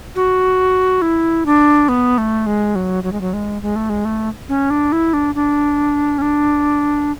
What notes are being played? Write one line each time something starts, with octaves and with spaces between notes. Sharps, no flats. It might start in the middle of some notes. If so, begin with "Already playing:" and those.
F#4
E4
D4
B3
A3
G#3
F#3
F#3
G#3
F#3
G#3
G#3
A3
G#3
A3
C#4
D4
E4
D4
D4
C#4
D4